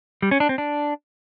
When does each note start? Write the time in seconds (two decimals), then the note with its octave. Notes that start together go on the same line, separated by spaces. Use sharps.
0.22 G3
0.31 C#4
0.40 D4
0.49 C4
0.58 D4